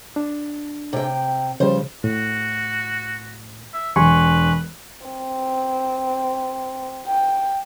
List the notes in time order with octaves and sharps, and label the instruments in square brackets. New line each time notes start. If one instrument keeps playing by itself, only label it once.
[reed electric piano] D4
[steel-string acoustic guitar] C3 G5
[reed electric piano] C#3 F3 G3 [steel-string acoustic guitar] C5
[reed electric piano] A2 [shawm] F#4
[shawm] E5
[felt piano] E1 [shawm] B4 [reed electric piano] G#5 C6 C#6
[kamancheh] C4
G5